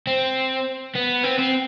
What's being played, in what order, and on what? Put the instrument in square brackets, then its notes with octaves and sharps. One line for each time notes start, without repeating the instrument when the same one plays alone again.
[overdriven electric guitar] C4
B3
C4
C4